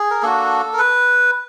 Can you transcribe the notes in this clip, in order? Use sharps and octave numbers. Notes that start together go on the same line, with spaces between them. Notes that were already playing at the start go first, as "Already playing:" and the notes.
Already playing: G#4
A#4
A#3 D4 F#4 A4
A#4
B4